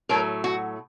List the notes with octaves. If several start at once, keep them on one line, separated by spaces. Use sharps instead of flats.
A2 F#3 A3 A#4
F#4